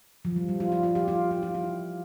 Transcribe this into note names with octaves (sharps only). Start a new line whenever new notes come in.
F3
G3
G3
F4
F4
F4
G4
F4
F4
F4
E4